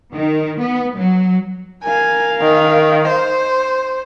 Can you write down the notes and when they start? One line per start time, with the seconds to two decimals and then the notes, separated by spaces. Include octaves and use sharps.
0.12 D#3
0.60 B3
0.96 F#3
1.84 A#4 F5 G#5
2.42 D#3
3.09 C5